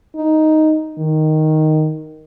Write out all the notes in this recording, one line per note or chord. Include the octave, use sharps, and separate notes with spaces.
D#4
D#3